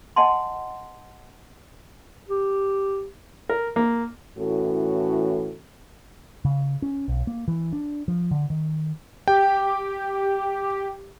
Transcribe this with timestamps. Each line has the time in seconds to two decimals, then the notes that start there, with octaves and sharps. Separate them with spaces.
0.16 D#5 F#5 G#5 A5 C6
2.29 G4
3.49 A#4
3.76 A#3
4.38 A2 E3 C#4 F#4 A4
6.45 C#3
6.82 C#4
7.08 B1
7.27 A#3
7.48 E3
7.73 D4
8.08 F3
8.31 D3
8.50 D#3
9.28 G4 G5